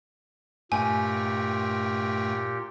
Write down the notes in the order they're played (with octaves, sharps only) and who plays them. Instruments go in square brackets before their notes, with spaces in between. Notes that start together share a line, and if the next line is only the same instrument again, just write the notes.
[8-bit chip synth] G2 A3 G5 [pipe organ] A#2 G4 [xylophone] G#5